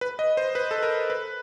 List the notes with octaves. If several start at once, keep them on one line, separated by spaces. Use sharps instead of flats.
B4
D#5
C5
B4
A4
A#4
B4